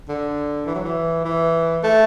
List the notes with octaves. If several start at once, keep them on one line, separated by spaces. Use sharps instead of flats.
D3
E3
F#3
E3
E3
A3